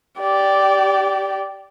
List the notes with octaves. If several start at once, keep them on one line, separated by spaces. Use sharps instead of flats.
G4 D5